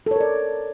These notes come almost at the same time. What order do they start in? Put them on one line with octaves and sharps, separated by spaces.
A4 C#5 A#4 D5